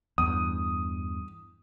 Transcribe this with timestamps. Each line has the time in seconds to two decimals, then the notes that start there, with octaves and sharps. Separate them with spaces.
0.18 E2 G2 D#6